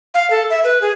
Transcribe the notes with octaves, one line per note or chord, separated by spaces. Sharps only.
F5
A4
E5
B4
G#4